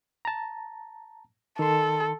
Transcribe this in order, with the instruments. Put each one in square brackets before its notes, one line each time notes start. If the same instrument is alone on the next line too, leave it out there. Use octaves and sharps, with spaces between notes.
[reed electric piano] A5 A#5
[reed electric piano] D#3 C6 [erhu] A4